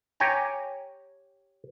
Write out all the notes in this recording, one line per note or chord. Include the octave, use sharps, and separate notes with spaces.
G4 C#5 G5 G#5 A#5